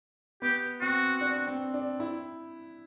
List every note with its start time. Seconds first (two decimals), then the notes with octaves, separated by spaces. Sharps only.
0.42 B3 G4
0.81 C4 F#4
1.21 D4
1.47 C4
1.74 D4
2.00 E4